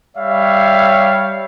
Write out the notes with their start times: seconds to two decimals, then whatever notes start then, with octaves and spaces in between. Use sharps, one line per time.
0.16 G3 C#5 E5 F5